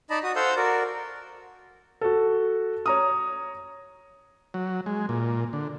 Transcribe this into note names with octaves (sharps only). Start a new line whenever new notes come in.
D#4 D5 D#5 A5 B5
F#4 D#6
A4 C5 F5 F#5 E6 G6
F#4 A#4 D5
F#4 A4
C#5 A#5 D#6
F#3
G#3
A#2
D3